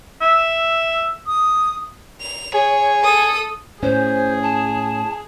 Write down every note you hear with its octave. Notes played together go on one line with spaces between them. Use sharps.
E5
D#6
F7
G#4 C#5
A4 D#6
A2 C#4 G#4 C5
A5